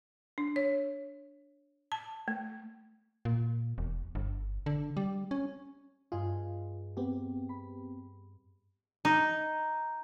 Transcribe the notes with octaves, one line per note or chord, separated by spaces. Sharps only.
D4
C#5
A5
A3
A#2
E1
G1
D3
G3
C#4
G2 F4 G#4 D#5
B3 C4 G4
B5
D#4